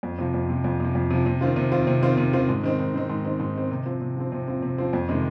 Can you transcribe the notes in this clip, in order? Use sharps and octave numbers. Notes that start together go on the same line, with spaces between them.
F2
C3 F3
F2
C3 F3
F2
C3 F3
F2
C3 F3
C3
D#3 C4 F4
C3
D#3 C4 F4
C3
D#3 C4 F4
C3
D#3 C4 F4
G#2
D#3 C4 D#4
G#2
D#3 C4 D#4
G#2
D#3 C4 D#4
G#2
D#3 C4 D#4
C3
F3 C4
C3
F3 C4
C3
F3 C4
C3
F3 C4
F2
C3 D#3 G#3